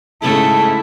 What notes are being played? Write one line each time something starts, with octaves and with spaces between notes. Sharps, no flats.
G#2 C#3 A3 E4 A5